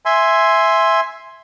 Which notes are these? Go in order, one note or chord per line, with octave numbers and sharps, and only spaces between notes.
E5 G#5 C6